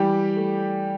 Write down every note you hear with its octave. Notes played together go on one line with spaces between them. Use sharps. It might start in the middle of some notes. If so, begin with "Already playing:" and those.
Already playing: E3 G3 G4
A3